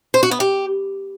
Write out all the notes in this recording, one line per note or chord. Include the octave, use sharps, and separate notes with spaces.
C5
F#4
B3
G4